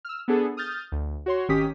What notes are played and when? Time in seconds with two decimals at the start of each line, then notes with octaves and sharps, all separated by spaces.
0.05 E6 F6
0.28 B3 D4 G#4 A4
0.57 D#6 F6 G6 A6
0.92 D2
1.26 F#4 C#5 C6
1.48 G#1 D#3 C#4 G4 D#6 B6